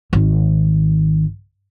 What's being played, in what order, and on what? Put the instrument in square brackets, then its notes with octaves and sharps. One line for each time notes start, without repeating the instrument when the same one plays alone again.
[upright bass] G#1 D#3